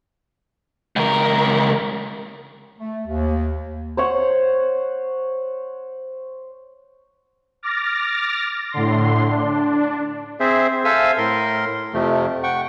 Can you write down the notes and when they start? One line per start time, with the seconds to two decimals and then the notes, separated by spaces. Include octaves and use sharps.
0.96 C#2 A#4
2.79 A3
3.07 D#2
3.97 C5 C#5 F#5
7.63 D6 F6 A6 A#6
8.72 A2 D3 C6
9.30 D4
10.40 C4 G#4 C5 E5
10.85 A4 C5 E5 F5 G#5 E6
11.18 A2 A#4 C6
11.94 F2 C3 F3 A3
12.43 F#5 G5 C#6